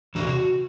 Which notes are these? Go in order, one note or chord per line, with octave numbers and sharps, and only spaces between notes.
E2 C3 F#4